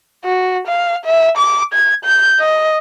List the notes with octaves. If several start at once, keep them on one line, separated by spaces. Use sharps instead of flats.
F#4
F5
E5
D6
G#6
G6
D#5